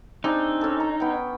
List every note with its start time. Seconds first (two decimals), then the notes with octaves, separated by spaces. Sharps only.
0.24 C4 D4 D#4 G#4
0.61 C#4 A4
0.80 A#5
1.00 B3 G5